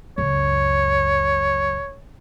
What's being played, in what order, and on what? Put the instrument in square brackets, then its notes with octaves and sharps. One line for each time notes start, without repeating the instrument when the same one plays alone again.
[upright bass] C#2 F#2 [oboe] C#5